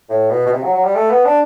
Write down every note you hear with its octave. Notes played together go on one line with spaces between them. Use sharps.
A2
B2
B2
C3
F#3
F#3
G3
A3
B3
D4